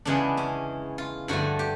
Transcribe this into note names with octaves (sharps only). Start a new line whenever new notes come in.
E2 C#3 E3 G#3 B3 D4
C#4
F4
G2 D3 F3 A3 F#4
G4